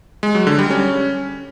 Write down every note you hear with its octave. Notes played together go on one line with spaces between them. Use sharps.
G#3
F#3
D3
G3
C#4